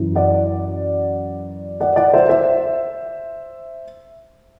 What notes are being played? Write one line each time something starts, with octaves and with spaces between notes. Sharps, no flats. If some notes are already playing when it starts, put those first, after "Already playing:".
Already playing: F#2 E3
D5 F#5
D5 F#5
D5 F#5
C5 E5
C5 E5